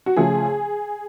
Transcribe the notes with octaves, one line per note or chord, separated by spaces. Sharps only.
F#4
C#3 F3 A3 G#4